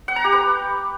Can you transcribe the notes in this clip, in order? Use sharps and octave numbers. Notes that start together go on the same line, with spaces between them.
F#5
A#5
G4
B4